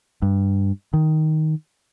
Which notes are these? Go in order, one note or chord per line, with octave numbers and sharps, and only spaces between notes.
G2
D#3